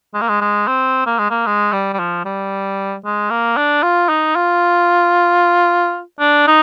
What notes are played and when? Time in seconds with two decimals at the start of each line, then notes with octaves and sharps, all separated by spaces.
0.14 G#3
0.21 A#3
0.29 G#3
0.41 G#3
0.67 C4
1.06 A#3
1.19 G#3
1.31 A#3
1.47 G#3
1.73 G3
1.93 G3
1.99 F3
2.25 G3
3.05 G#3
3.31 A#3
3.57 D4
3.83 F4
4.09 D#4
4.36 F4
6.20 D4
6.47 D#4